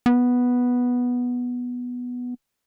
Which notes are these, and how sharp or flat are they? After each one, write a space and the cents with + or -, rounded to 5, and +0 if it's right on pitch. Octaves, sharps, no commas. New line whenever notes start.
B3 -5